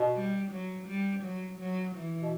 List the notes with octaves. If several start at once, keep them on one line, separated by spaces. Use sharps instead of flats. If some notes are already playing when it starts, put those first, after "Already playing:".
Already playing: B2
G3
F#3
G3
F#3
F#3
E3
B2